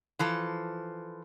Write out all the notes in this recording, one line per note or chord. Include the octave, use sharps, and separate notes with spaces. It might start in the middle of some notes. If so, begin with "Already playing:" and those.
E3 F3 A4